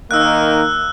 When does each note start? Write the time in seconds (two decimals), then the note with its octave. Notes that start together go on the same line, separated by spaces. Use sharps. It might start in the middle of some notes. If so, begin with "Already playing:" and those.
0.11 D#3 A#3 D#4 E6 F#6